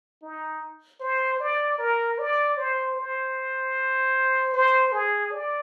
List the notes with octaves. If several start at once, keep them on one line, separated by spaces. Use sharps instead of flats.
D#4
C5
D5
A#4
D5
C5
C5
C5
G#4
D5